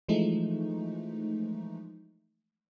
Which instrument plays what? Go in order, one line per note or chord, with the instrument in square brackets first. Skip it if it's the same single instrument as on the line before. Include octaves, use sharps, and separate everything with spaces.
[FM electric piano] E3 F3 G#3 A3 D#4